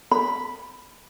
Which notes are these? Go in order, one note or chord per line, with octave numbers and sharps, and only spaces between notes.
B5